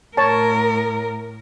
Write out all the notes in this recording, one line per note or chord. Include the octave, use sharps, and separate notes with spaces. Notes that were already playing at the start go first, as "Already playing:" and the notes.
A2 A#4 C#5 A5